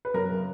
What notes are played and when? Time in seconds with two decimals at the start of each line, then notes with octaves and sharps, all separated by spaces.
0.05 B4
0.14 F#2 A#4
0.30 C#3